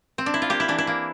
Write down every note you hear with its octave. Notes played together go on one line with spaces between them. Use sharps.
C4
D4
E4
F4
A#3 G4
E4
E3 D4
E4
A#3